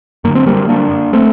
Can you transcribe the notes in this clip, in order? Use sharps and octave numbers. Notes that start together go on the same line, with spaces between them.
F#2 D3 A#3
C4
G3 A#3
A#3 D4
A3 C4